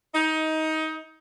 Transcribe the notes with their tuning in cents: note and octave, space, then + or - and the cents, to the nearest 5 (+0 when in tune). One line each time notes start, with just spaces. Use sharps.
D#4 +20